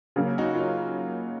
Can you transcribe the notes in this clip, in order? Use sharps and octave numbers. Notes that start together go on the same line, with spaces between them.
C#3 F#3 A#3 C#4
D#4 F#4
F4
D#4